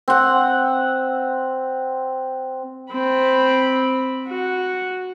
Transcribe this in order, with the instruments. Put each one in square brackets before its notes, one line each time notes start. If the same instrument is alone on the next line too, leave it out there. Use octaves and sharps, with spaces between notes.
[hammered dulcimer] C4 F#5
[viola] C4 B5
F#4